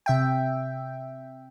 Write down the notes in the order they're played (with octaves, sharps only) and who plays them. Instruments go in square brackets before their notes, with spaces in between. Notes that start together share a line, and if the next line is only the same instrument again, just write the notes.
[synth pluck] C3 E5 G5